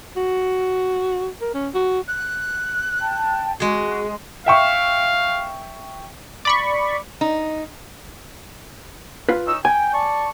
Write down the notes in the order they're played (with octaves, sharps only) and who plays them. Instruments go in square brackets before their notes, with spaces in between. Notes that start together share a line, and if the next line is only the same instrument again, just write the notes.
[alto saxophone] F#4
A#4
C#4
F#4
[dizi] F#6
[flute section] G5 A5
[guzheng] G#3 G#4 [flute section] F#4
[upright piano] E5 G5 C#6 [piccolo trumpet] F5
[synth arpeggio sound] D5 B5 C#6
[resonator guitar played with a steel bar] D#4
[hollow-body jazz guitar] F4 B4
[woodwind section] C#4 D#4 E6
[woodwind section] G5 [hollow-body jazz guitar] G#5
[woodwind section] D5 A5 C#6